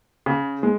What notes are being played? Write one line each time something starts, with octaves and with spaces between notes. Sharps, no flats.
C#3
G#3